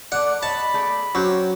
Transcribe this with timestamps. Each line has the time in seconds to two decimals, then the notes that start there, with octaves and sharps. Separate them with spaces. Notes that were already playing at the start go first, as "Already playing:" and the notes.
0.12 A3 D5 F#5
0.43 C#5 D#5 A5 B5
0.74 A3 G#4 D5
1.15 F#3 C#4 G4 C5